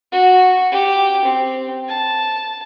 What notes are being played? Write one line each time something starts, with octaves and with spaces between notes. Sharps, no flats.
F#4
G4
C4
A5